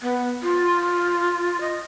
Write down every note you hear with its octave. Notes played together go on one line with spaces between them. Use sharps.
B3
F4
D#5